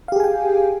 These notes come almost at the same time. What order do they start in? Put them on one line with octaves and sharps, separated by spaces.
F5 G4 G#4 G#5 G5